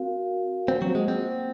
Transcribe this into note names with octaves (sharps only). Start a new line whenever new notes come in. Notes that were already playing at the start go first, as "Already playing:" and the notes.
Already playing: C4 F#4 A#4 F5
A#3 C4 F4 C5 F#5
F#3
G#3
C4